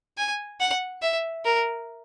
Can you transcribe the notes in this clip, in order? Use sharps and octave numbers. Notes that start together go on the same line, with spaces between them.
G#5
F#5
E5
A#4